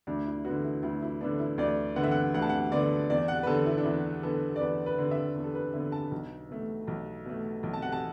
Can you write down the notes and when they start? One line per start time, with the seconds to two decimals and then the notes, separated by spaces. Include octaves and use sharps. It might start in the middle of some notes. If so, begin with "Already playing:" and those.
0.07 D2 D4
0.26 E4
0.45 D3 B3 F#4
0.65 E4
0.83 D2 E4
1.02 E4
1.21 D3 B3 D4
1.40 E4
1.58 D2 D5
1.96 D3 B3 F#5
2.03 E5
2.11 F#5
2.34 D2 F#5
2.42 A5
2.49 F#5
2.72 D3 B3 D5
3.10 E2 D5
3.28 F#5
3.43 B4
3.47 D3 B3 A4
3.66 E4
3.78 D4
3.85 E2 E4
4.23 D3 B3 A4
4.56 D5
4.61 E2 B4
4.86 B4
4.98 D3 B3
5.11 E5
5.36 E2
5.44 A4
5.55 B4
5.74 D3 B3 E5
5.92 A5
6.11 B1
6.49 B2 A3
6.87 B1
7.25 B2 A3
7.63 B1
7.73 A5
7.82 F#5
7.92 A5